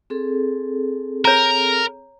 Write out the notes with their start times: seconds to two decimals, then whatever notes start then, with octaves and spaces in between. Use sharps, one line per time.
0.10 C4 G#4 A4
1.25 A#4 C#5 A#5